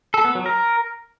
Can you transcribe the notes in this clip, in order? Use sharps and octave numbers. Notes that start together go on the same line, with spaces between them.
A4
B3
F#3
A#4